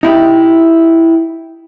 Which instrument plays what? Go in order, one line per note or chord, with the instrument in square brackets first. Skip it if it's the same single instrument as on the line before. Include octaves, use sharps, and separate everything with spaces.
[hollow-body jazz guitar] D#4 E4 G4